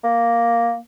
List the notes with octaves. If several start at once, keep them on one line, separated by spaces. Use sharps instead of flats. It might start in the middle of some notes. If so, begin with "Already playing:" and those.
A#3